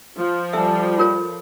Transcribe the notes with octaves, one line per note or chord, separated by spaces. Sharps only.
F3 F4
G3 A4 E5 A5
F4 A#4 C#5